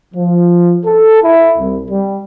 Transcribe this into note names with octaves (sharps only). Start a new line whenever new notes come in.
F3
A4
E4
C2
G3